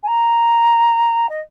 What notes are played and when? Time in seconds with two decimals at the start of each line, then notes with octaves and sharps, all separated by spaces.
0.03 G#5
0.07 A#5
1.29 D#5